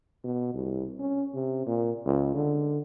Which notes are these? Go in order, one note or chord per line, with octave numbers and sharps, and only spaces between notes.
B2
C2
C#4
C3
A#2
C#2
D3